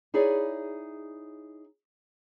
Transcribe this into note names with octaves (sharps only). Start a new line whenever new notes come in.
D#4 E4 G#4 C#5 D5